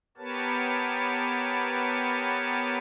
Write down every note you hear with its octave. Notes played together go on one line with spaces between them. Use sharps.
B3 G4 A#4 B4 C#5 A5